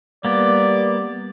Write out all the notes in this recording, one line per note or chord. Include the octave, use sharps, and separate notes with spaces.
G3 A#3 B3 D5